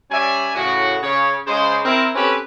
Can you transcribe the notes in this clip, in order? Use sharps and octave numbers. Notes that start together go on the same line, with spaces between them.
G3 C#4 D5 E5 G#5
A2 C#3 F#4
C#3 C#5
C#3 G#3 C5
C4 E4 A#4
C4 C#4 G4 A4 B4